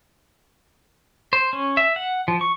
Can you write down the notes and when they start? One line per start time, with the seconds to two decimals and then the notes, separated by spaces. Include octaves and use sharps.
1.33 C5
1.53 C#4
1.77 E5
1.96 F#5
2.28 F3
2.41 C#6